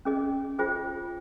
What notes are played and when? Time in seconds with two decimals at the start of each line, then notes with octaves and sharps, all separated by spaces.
0.05 C#4 G#4 D#5
0.59 F4 G#4 C5 D#5 G5